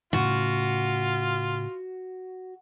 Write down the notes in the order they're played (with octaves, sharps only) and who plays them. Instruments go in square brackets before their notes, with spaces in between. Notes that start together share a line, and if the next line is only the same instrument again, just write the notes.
[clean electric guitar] A2 C#3 [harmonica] F4 [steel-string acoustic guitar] F#4